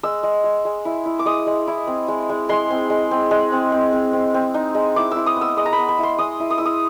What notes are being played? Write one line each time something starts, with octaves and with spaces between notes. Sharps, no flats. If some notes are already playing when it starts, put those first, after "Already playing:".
G#3 E6
G#3
G#3
G#3
E4
E4
D6
G#3 D#6
G#3
E4
C4
G#3
G#3
G#3 C6
C4
G#3
C4
G#3
C4
C4
C4
C4
C4
D#4
G#3
E4 D6
E4 E6
D#6
B3
E6
G#3 D#6
A#5
B3 B5
B5
E4 C6
G#3 D#6
E4
D#6
E4 E6
D#6